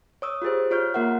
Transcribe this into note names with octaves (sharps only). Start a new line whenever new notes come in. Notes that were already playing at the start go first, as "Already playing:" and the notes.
C#5 D#6 E6
F4 G4 G#4 C5
F4 C#5 F6 G6
A#3 F4 A#4 E5 F#5